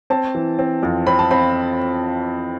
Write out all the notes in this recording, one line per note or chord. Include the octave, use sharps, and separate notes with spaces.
C4 A5
E3
C4
F2
C4 B5
A5
C4 B5